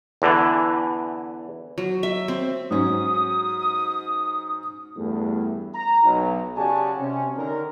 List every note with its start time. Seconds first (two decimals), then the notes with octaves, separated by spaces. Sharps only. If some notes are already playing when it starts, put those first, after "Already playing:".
0.22 E2 D3 E3
1.78 F#3
2.03 E5
2.28 C4
2.71 G#2 F#3 C#4 D#6
4.96 E2 G2 A3
5.74 A#5
6.03 B1
6.56 C#3 F#4 G4 D5 G#5 A5
6.98 C3 C#4
7.36 D3 D#3 A#4